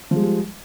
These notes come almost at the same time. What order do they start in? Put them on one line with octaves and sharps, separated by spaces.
F3 G#3 G3